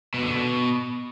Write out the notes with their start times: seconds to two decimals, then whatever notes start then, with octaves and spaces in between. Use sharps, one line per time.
0.14 B2
0.22 D3
0.31 B2